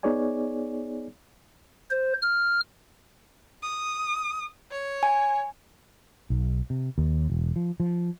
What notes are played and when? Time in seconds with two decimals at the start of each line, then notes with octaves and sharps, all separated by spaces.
0.03 B3 D#4 G#4 C#5 D5 G#5
1.91 C5
2.22 F6
3.62 D#6
4.71 C#5
5.03 G#5
6.30 B1
6.70 C3
6.98 D#2
7.30 E1
7.56 F3
7.80 F3